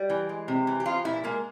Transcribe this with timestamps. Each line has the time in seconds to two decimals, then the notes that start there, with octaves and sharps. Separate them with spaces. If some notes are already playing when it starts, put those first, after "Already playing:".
Already playing: G3
0.10 E3
0.29 G#3
0.48 C3
0.67 E3
0.80 G4
0.86 F3 F4
1.05 A#2 E4
1.24 G#3 A#3